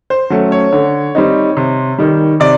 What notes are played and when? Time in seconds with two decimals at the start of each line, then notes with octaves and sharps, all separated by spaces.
0.10 C5
0.30 F#3 A3 C#4
0.52 C#5
0.72 D3
1.15 G3 C4 D#4
1.57 C3
1.98 D#3 G3
2.40 C3 D5